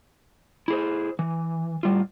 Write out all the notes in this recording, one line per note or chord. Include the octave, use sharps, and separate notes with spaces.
E4 G#4 C5
E3
A2 G3 F4